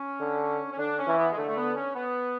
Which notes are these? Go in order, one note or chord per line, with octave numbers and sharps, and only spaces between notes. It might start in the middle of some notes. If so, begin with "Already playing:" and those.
Already playing: C#4
D3
C#4
D3 D4
C#4
E3
B3
G#3
D3 A3
A3
B3
C#4
B3